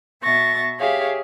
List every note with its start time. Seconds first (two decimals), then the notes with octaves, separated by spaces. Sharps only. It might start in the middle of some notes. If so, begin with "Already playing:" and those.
0.23 B2 E5 C#6 A6 A#6
0.79 G4 G#4 C#5 E5 F5